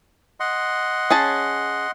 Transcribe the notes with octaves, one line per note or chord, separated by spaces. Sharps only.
D#5 F#5 C6
C#4 G#4 A5